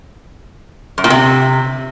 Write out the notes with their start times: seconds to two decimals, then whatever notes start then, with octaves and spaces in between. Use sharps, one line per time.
0.98 F#2
1.04 A#2
1.10 C3